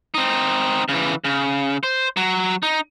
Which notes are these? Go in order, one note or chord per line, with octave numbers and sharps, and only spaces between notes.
C4 D#4
C#3 E3
C#3
C5
F#3
D#4